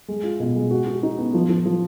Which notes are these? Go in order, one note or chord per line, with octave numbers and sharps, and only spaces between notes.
G#3
F4
B2
G#3
F#4
F#4
D#4
B3
F3
F3
F3